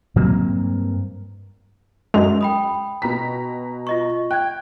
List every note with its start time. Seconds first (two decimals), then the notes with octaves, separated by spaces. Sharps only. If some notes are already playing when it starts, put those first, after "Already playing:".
0.16 G2 F#3 A#3 C4
2.14 F#2 G#3 F7
2.41 G5 B5 D#6
3.02 B2 A#5 B6
3.87 F4 D#5 C#6
4.31 G5 F#6 G#6